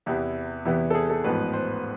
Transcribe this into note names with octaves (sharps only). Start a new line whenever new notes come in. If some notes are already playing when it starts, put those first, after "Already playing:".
E2 C3 E3 B3 E4
E2 C3 E3 B3 E4
A4
G#4
A4
A1 G#2 F3 B3 B4
C5